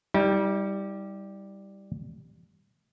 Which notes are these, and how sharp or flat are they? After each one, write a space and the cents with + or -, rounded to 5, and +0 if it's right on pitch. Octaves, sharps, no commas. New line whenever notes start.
G3 +0 E4 -45